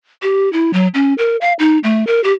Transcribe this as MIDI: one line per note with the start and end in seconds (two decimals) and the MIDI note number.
0.22 0.51 67
0.53 0.71 64
0.73 0.88 54
0.94 1.14 61
1.18 1.37 70
1.41 1.53 77
1.59 1.78 63
1.84 2.06 57
2.07 2.22 70
2.24 2.32 67